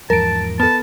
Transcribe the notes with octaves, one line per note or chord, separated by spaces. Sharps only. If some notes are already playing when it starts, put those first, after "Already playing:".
E2 G#2 F3 A#4 A5 D7
B3 A4 A5